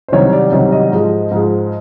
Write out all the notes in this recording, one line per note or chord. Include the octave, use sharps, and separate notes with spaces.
C5
C2 C3 D#3 F#3 C#5
D5
C2 C3 D#3 F#3 D#5
D#5
G#2 F3 G#3
G#2 F3 G#3